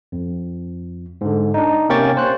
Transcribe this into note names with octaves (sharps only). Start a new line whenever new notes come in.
F2
G#2 D3
D4 D#4
C3 A#3 C#4 G5 C#6 A6
C5 F#6